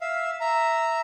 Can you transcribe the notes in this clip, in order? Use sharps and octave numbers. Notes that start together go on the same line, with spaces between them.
E5 F5
E5 A#5